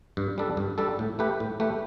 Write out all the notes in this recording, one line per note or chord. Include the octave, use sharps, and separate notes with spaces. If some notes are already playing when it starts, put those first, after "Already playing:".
G2
G3 D4 A4
G2
G3 D4 A4
A2
A3 G4 B4
A2
A3 G4 B4